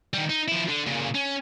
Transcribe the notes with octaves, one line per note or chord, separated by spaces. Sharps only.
D#3 G3
D#4
F3 E4
D3
A#2 C#3
C#4